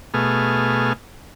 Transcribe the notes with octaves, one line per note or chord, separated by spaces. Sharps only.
B2 A3 G#4 F6